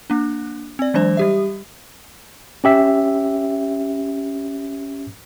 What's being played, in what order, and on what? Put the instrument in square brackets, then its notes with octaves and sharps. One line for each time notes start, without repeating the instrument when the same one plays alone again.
[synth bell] A#3 D4
C4 D5
E3 F#3 G#3 D4 C5
G3 G4 E5
[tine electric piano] C#4 G4 E5